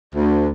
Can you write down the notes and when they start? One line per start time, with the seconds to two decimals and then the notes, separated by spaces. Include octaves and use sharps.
0.15 D2